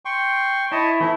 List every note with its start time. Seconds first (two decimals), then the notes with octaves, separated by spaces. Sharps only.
0.05 G5 C6 C#6
0.72 E4 C#5 D#5 A5
1.00 E3 A3 C4 E4